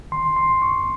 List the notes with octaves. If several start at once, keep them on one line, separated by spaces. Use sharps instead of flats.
D#3 C6
C6
F#2
C#6